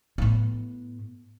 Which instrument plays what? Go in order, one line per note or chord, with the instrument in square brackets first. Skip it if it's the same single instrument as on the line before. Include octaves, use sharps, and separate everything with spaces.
[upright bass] A2 B3